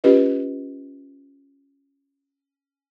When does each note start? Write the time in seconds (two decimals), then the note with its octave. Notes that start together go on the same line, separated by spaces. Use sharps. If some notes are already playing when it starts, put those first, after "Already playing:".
0.04 C#4 F4 G4 B4 D#5